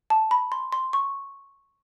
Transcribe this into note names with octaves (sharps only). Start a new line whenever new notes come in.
A5
B5
C6
C6
C#6